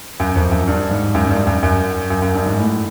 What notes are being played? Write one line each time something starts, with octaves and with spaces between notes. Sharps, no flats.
F#2
F2
F#2
G2
G#2
F#2
G#2
G2
F#2
F#2
F#2
F#2
G2
G#2
A2